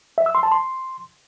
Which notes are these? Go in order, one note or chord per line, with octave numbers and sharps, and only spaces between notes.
E5
E6
C6
A5
C6